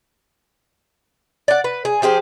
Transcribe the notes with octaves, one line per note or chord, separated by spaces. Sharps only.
D5 F#5
B4
G#4
F3 G4 G#4 C5